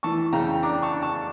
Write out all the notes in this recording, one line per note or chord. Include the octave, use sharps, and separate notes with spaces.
E3 A5 C#6
C#3 G5 A#5
D4 A#5 D6
A5 C#6
D4
A5 C#6